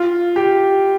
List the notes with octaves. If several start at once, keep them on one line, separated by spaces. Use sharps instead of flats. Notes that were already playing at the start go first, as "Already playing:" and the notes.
Already playing: F4
G4